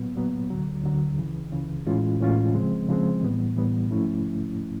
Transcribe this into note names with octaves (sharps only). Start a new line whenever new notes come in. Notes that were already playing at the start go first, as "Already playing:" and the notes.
Already playing: A#2 F#3 B3
A#2 F#3 B3
D2 D3 F#3
D2 D3 F#3
C#2 C#3 E3
C#2 C#3 E3
A2 E3 G#3 C#4 F4
A2 E3 G#3 C#4 F4
C#3 F3 G#3 C4
C#3 F3 G#3 C4
A2 E3 G3 B3
A2 E3 G3 B3
G#2 F3 A3 C#4 E4